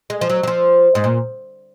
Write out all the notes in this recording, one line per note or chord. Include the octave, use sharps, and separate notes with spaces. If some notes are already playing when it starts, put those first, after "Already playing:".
G#3
F3
F#3
F#3
F3
G#2
A#2